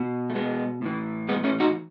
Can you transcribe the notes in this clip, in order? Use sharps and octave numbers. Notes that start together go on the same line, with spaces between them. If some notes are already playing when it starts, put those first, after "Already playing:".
Already playing: B2
A3
G#3 B3
A2 E3
G#3 B3
A3 C#4
D#4 F#4